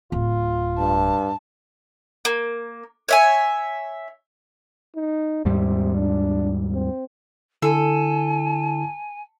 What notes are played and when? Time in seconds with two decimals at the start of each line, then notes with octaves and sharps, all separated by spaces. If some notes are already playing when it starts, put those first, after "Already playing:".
0.12 D1 F4
0.78 G2 A5
2.25 A#3
3.09 C#5 E5 G#5
4.96 D#4
5.45 D#2 G#2 C3 G3
5.95 D4
6.73 C4
7.62 D3 E4 A4 G#5